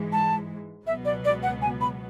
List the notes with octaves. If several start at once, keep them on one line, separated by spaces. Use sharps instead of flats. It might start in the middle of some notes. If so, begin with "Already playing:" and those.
Already playing: G#2 E3 G#3
A5
C#2 B2 F#3 B3 E5
D5
D5
F#5
G#5
B5